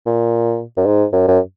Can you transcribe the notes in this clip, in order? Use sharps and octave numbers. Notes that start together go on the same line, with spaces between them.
A#2
F#2
G#2
F#2
F#2